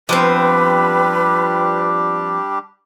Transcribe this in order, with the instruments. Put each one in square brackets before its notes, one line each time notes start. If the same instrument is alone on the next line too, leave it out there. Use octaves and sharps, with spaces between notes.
[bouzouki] F3 B3 C4 [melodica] G3 D4 G4 [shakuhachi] B4